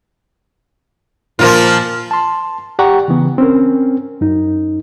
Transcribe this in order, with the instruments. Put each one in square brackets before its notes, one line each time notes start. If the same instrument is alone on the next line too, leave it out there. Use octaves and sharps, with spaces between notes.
[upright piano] A#2 A#4 A6 [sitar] F3 A#3 F4
[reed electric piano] A5 C6
G4 D5 F#5 G5 A#5 C#6
C#3 E3 B3
C4 C#4 A#4
F#2 D#4